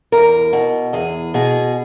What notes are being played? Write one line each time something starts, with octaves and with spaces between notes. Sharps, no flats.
E2 A#4
B2
E2 G#4
B2 G#4